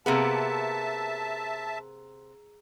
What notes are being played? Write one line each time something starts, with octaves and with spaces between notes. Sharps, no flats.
C3 A#3 B3 G#4 E5 A5 A#5 E6